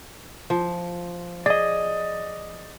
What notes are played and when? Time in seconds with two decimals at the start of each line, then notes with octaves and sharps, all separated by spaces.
0.50 F3
1.46 G#4 D5 D#5